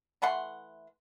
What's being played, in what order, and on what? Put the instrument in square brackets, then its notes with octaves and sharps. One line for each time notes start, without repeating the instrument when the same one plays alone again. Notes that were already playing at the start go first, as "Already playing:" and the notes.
[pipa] E3 A3 F#5 C6